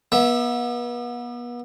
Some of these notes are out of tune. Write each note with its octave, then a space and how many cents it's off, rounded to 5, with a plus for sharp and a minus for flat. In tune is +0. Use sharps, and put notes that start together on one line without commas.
B3 -35 E5 +0